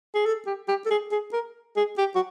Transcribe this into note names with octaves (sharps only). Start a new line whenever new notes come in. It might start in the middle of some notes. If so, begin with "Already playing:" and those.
G#4
A4
G4
G4
A4
G#4
G#4
A#4
G#4
G4
F#4